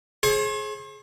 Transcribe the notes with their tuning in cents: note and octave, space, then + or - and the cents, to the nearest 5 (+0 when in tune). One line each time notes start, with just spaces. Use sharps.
G#4 +25 C5 +45